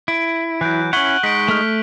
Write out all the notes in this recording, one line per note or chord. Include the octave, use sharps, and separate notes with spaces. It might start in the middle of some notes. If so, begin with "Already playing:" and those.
E4 D7
E3 F#3 F#6 G6 D7
C#4 E4 F#5 C#6 F#7 G7
G#3 D#4 B6 D7
A3 F6